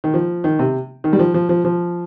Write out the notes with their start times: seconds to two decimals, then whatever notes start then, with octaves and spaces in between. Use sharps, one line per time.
0.04 D#3
0.14 F3
0.44 D#3
0.59 C3
1.04 D#3
1.13 G3
1.19 F3
1.34 F3
1.49 F3
1.65 F3